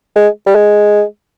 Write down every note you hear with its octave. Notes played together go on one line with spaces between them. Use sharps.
G#3
G3
G#3